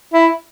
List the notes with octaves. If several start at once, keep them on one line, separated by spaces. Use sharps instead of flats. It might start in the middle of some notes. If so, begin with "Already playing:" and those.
E4